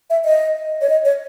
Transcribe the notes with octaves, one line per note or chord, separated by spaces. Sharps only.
E5
D#5
C#5
D#5
C#5